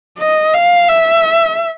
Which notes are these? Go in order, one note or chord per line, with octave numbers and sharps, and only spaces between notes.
D#5
F5
E5